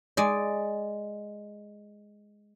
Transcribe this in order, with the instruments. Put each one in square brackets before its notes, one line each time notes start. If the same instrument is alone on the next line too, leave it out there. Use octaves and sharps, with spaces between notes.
[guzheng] G#3 D5